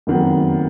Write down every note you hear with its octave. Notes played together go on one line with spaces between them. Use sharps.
F#1 F2 D#3 F#3 B3